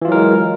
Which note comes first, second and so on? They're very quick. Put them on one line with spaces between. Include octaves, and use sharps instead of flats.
E3 F4 F#3 A#4 G#3